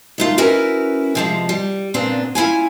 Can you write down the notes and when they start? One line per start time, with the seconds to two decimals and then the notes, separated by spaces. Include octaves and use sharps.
0.18 D#3 A3 F4
0.38 C#4 E4 F#4 A#4 B4
1.15 C3 F3 G#3
1.49 G3
1.94 A#2 C#3 B3 C4 D4
2.35 C#4 E4 F4 G#5